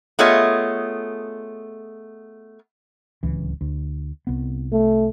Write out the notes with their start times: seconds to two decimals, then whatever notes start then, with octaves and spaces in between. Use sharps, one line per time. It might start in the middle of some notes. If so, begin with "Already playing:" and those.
0.19 A3 B3 F4 G#4 C#5 D#5
3.23 D1 C#2 E3
3.61 D2
4.27 C2 B3
4.72 A3